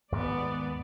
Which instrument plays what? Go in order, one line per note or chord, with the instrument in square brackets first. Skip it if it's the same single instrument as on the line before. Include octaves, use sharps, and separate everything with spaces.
[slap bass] D#2 G#2 G#3 [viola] B3 D5